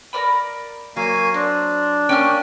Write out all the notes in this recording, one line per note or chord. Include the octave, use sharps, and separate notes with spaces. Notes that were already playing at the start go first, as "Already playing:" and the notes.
A#4 D5 B5
F#3 A#3 F5 G#5
C4 D4
A#3 C#4 G5 G#5 F6